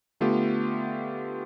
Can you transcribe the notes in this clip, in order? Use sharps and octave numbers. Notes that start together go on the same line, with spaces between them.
D3 A3 B3 F4 G4